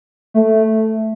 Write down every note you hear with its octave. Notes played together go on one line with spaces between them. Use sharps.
A3